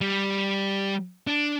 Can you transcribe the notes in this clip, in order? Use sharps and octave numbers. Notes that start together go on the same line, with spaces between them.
G3
D4